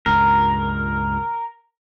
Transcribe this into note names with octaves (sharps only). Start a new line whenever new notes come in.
C#2 G2 A#2 A#4